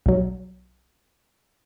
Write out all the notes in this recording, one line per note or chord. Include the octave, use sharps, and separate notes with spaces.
B1 F#3